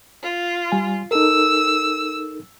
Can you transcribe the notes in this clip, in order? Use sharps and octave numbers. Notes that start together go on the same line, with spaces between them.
F4
G3 G#5
D#4 A4 A#4 E6